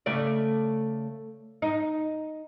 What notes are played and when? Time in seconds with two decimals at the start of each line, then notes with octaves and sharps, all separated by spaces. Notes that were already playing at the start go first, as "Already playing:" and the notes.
0.06 C#3 A3 D5
1.62 D#4